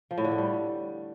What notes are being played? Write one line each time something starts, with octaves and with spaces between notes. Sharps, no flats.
F3
A2
D3
A3
G3